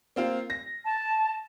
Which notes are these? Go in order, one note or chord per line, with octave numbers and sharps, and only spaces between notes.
A#3 C4 F4
A#6
A5